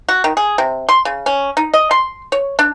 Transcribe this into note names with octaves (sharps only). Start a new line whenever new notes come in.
F#4
D#3
G#4
C3
C6
C#3
C#4
D#4
D#5
C6
C#5
D4